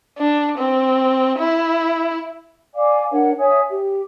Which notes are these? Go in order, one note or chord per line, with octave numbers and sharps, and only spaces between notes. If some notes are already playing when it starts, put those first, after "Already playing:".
D4
C4
E4
D5 F5 G#5 D6
D4 A#4 C#5 F#5
C#5 E5 G#5 D#6
G4